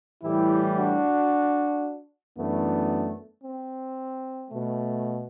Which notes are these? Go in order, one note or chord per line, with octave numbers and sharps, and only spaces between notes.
A2 E3 G3 E4 G4
D4 F#4
F#2 E3 A3 B3 D4
C4
B2 A3